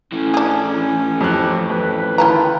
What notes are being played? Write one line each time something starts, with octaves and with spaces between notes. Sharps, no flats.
A2 E3 C#4
D4 G#4
F2 F#3 F#4 G4 F#6
F2 B4
D3 D#3 E4 F4 B4 G5 A5 A#5